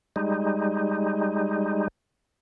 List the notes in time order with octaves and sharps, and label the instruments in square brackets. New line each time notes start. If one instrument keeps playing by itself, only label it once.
[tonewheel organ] G3 G#3 D#4